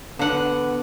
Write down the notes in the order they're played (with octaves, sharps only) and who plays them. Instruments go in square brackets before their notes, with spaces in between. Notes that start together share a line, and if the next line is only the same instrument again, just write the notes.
[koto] D3 F#5 [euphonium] B3